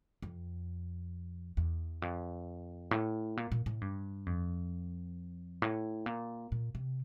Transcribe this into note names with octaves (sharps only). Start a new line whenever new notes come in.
F2
E2
F2
A2
A#2
A#2
A2
G2
F2
A2
A#2
A#2
C3